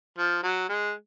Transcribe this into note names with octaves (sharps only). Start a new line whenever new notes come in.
F3
F#3
G#3